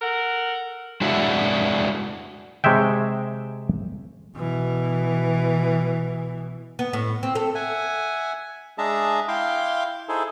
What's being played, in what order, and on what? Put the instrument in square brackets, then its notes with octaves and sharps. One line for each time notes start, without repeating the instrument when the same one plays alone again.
[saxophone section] A4 A#4 F#5
[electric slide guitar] G#3 D4 E4 F#4 D5 E5
[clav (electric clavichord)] C3 G#3 C#5 E5 G5
[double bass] B2 E3
[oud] B3
A2
C4
A4
[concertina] E5 F#5 G#5
G#3 D4 G#4 E5 A5 A#5
E4 F5 G5 C6 D6
D#4 E4 G#4 A4 C5